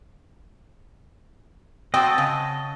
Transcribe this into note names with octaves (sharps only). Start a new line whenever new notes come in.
C4 F#4 D#5 G5 A5
C#3